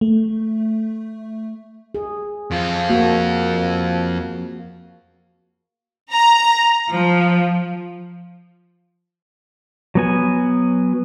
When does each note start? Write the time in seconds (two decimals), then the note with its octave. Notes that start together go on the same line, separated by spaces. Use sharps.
0.01 A3
1.95 G#4
2.51 F2 F4
2.90 A#3 F#4
6.11 A#5
6.90 F3
9.95 F#3 B3 G#5